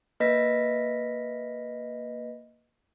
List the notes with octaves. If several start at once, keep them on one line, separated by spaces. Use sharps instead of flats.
A#3 B4 D#5 A#6 B6